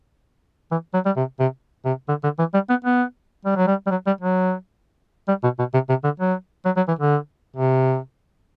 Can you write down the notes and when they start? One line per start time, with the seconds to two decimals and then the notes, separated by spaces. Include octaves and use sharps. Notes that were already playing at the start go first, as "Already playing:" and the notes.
0.71 E3
0.94 F#3
1.06 G3
1.16 C3
1.40 C3
1.85 C3
2.09 D3
2.24 D3
2.39 E3
2.54 G3
2.70 B3
2.85 B3
3.45 G3
3.56 F#3
3.67 G3
3.87 G3
3.91 F#3
4.07 G3
4.21 F#3
5.28 G3
5.43 B2
5.59 B2
5.74 C3
5.89 C3
6.04 D3
6.20 F#3
6.65 F#3
6.76 F#3
6.88 E3
6.99 D3
7.56 C3